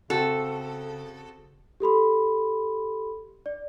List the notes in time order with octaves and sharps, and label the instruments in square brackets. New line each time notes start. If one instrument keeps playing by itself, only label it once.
[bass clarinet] C#3 [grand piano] C4 F#4 [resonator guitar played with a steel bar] A4
[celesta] G4 A4 B5 C6
D5